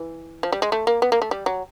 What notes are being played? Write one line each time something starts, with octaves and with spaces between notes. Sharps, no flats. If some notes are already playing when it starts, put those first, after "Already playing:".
Already playing: E3
F3
G3
G#3
A3
A#3
B3
A#3
A3
G3
F#3